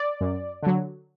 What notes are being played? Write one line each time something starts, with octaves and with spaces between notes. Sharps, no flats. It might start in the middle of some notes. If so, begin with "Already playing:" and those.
Already playing: D5
F#2
D3 F#3